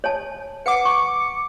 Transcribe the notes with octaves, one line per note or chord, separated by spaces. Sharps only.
C#5 G#5 A5
B4 F#5 D6 C#7
C#6